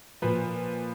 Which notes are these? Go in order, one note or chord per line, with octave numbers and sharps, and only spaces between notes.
A#2 F3 B4